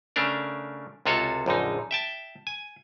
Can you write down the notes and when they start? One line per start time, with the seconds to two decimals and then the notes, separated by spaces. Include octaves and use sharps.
0.16 C#3 A3 C#4 D4 A#4
1.06 C#2 C3 F4 F#4 A4 C#5
1.46 A#1 F#2 D3 D#4
1.91 E5 G5 A5
2.47 G#5